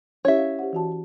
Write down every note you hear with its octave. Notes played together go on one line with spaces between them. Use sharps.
C#4 E4 G4 C#5 E5
F5
G4 C5 F#5
E3 F#4 A5